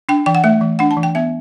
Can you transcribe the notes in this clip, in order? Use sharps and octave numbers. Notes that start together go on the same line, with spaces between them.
D4 G5
E3 G5
F#5
A3 E5
E3
D4 F#5
A5
E3
G5
B3 E5